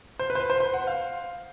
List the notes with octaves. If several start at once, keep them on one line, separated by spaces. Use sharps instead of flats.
C5
B4
C5
B4
C5
C5
F#5
F5